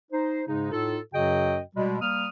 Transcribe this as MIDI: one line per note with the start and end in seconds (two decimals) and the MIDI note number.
0.11 0.42 63
0.11 0.42 72
0.47 0.71 44
0.47 0.71 49
0.47 0.71 56
0.47 0.71 63
0.72 0.98 45
0.72 0.98 63
0.72 0.98 65
0.72 0.98 69
1.13 1.59 42
1.13 1.59 49
1.13 1.59 54
1.13 1.59 66
1.13 1.59 75
1.13 1.59 79
1.76 2.01 47
1.76 2.01 55
1.76 2.01 56
2.01 2.29 55
2.01 2.29 58
2.01 2.29 87
2.01 2.29 89